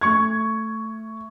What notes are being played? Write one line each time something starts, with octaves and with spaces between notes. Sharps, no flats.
A3 C#6 G#6